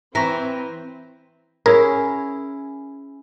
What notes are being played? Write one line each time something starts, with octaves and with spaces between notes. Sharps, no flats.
E3 C4 E5 A#5 C#6 A#6
C#4 E4 G#4 A#4